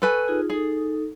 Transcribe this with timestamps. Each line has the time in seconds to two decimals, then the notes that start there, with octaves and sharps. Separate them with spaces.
0.02 A4 B4 G#5 C#6
0.28 D#4 F4 G#4
0.50 D#4 G#4 A4